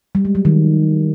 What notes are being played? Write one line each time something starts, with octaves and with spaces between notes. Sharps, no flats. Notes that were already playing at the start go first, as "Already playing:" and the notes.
G3
G#3
F#3
D#3